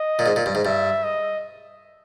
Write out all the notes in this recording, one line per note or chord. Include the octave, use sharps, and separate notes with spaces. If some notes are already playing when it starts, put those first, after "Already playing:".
Already playing: D#5
A#2
G#2
A#2
G2
G#2
G2 E5
D#5